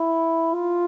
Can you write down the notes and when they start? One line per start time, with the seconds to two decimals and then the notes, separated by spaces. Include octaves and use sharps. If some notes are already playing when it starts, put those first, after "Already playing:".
Already playing: E4
0.54 F4